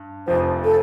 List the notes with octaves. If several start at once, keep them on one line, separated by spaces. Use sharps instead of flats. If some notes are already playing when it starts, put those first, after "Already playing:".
Already playing: G2
F1 F2 F3 C5
A4